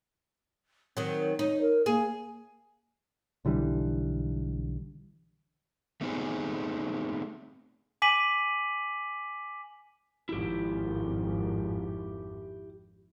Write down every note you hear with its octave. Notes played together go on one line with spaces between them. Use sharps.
D#3 F#3 C4
D#4 C#5
A#4
A#3 G#4
B1 D3 E3 G3
A3 B3 C4 D#4 G4 G#4
G#5 D6 B6 D#7 F#7
G#1 F2 E4 G4